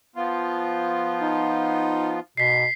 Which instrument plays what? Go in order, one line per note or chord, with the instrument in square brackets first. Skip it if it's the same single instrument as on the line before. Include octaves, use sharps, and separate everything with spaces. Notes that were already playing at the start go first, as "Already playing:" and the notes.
[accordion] F3 B3 F4
[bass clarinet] D#4
[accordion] G#2 [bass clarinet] B2 [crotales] B6 C7